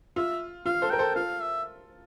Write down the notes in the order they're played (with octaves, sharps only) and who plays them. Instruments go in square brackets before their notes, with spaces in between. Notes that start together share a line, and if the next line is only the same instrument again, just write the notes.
[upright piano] F4 [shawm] E5
[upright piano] F4 [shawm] F5
[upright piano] A4 C5
[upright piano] A#4 [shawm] G5
[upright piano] A4 C5
[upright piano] F4 A4 [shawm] F5
[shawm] E5